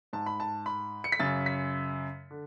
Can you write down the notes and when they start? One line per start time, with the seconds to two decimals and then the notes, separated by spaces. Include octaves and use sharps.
0.13 G#2 A5
0.26 B5
0.40 A5
0.66 B5
1.04 C#7
1.12 B6
1.19 F#2 C#3 A6
1.46 B6
2.31 D3